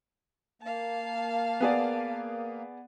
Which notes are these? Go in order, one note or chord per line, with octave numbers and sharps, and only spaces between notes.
A#3 F5 A5
B3 G#4 D5